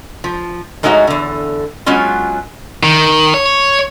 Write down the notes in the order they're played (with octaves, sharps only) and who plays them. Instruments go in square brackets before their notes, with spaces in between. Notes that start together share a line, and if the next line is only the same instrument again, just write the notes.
[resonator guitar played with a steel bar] F3
G#2 G#3 A3 D#4 F#4 C#5
E2 D3
F#3 G#3 B3 C#4 F4
[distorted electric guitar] D#3
C#5